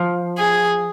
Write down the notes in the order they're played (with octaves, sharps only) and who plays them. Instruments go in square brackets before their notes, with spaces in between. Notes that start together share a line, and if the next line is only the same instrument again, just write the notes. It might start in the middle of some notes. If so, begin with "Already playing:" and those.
Already playing: [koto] F3
[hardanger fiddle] G#4